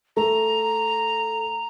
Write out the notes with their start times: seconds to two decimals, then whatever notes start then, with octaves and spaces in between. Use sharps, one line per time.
0.17 A3 A#5